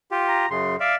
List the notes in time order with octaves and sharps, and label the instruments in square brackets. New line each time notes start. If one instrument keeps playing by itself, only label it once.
[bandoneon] F4 G4
[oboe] A#5
[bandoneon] F#2 C#3 [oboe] C6
[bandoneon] D5 E5 [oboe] F5